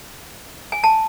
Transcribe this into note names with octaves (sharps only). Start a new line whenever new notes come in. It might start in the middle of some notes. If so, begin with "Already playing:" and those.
G#5
A5